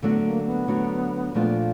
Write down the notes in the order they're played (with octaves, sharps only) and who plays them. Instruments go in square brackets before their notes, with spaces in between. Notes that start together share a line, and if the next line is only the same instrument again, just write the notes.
[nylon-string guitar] D3 F#3 A3 D4 F#4 [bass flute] B3
[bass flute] A#3
B3
[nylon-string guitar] D3 F#3 A3 D4 F#4
A#2 F3 A3 D4 F4